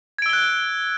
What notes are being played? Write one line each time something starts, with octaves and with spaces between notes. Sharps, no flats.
E6 F#6 G#6 D7 G7